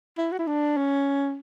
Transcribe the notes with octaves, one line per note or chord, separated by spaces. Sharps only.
E4
F#4
E4
D4
C#4